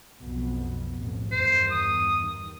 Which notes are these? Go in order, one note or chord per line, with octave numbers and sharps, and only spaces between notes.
B1 F2 B2
A1 F2
E2 G2 D#3 C5
D#6